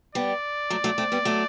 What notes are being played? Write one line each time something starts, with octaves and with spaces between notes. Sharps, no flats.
G3 B3 D5
F#3 A3
F#3 A3
A3 C4
G3 B3
F#3 A3